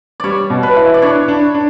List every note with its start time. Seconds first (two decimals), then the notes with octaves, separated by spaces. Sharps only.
0.20 G3 C#5 D5
0.50 B2
0.63 B4
0.76 E4
0.94 D5
1.02 D4 C#5
1.28 D4
1.54 D4